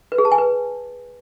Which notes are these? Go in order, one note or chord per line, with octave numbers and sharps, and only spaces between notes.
B4
G#4
A5
G#5
B4